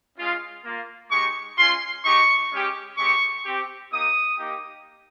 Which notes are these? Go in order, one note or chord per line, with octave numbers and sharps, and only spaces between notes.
G#3 C#4 F4
A#3 F4
G#3 D#4 G4 C#6
G#3 C#4 F4 C6
G#3 D#4 G4 C#6
G#3 C#4 G4
G#3 C4 G4 C#6
C4 G4
A#3 D#4 G4 D#6
A#3 D#4 G4